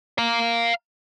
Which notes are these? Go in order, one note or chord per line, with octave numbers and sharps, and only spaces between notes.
F5 A#5